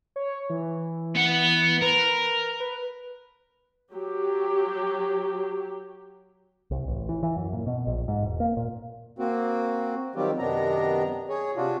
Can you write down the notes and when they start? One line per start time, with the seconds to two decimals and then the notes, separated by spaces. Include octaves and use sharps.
0.16 C#5
0.50 E3
1.15 B3 F#5
1.82 A#4 B4
2.60 B4
3.91 F#3 G4
6.71 C2
6.88 A1
7.09 E3
7.23 E3
7.37 F#2
7.53 A#2
7.66 B2
7.87 A#1
8.08 G#2
8.23 E1
8.40 A#3
8.57 A#2
9.19 A#3 C4 F#4
10.16 D#3 F#3 G3 C4 F4 G4
10.39 F#2 C3 D#3 B3 D4 A#5
11.29 G#4 C#5
11.56 C3 D4 F4 F#4